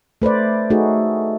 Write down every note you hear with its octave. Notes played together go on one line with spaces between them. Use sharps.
A3 B4 C5 D5
A3 D#4 F#4 G#4